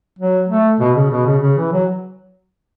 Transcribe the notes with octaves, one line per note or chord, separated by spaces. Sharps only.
F#3
A3
B2
C#3
B2
C#3
C#3
E3
F#3